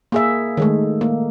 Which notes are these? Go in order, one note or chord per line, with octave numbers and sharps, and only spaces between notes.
A#3 G#4 E5
D#3 G#3 A3
A#3